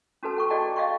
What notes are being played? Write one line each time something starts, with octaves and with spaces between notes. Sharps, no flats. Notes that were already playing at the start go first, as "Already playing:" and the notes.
C#4 F#4 A4 B4 A5
A4 G5 C#6
F#4 G#4 D5 D#5 G5 A5
D5 D#5 F5 G5 C6 C#6